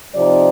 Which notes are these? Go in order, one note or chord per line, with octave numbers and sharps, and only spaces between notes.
C3 F3 C4 D#4 D5